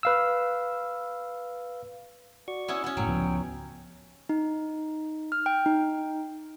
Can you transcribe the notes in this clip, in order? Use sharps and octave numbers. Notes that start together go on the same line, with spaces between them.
B4 F5 E6
F#4 D5 C#6
B3 C#4 E4
B3 C#4
F#1 A2 F#3 G5
C#2 F3 B3
D#4
F6
G5
D#4